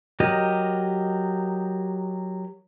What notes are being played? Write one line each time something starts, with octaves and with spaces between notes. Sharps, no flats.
F#3 G4 A#4 D#5